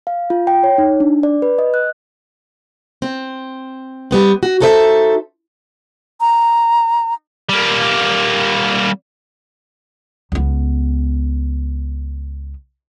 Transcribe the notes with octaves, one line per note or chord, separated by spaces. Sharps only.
F5
F4
G5
C#5
D#4
D4
D5
B4
D#5
F#6
C4
G3 B3 C4
F#4
D#4 F#4 A4 C5 D5 E5
A#5
G3 A#3
C#2 B3